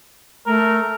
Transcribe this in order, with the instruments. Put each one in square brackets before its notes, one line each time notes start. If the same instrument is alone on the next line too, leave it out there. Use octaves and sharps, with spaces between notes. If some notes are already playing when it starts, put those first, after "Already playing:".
[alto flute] A3 [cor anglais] A#4